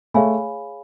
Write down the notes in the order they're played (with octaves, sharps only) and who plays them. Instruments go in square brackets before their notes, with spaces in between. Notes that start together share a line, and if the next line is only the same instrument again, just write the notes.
[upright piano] A3 [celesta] G#4 C#5 F5 G#5 B5